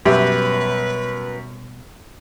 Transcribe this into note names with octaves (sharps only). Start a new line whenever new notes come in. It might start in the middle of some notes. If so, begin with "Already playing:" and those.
F#2 B2 G3 G4 B4 E5